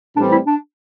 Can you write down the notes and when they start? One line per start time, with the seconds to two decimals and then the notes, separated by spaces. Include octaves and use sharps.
0.16 A2 E3 G3 C4 D4
0.32 E4
0.46 D4